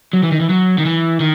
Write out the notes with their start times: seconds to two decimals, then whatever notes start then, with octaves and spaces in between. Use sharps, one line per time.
0.13 F#3
0.23 E3
0.32 D#3
0.41 E3
0.49 F#3
0.78 D#3
0.85 E3
1.20 D#3